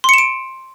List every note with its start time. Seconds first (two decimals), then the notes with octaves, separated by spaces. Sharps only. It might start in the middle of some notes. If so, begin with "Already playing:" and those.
0.04 C6
0.09 C#7
0.14 E7
0.18 D7